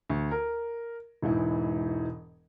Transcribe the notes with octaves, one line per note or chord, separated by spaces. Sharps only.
D2
A#4
E1 G#2 E3 E4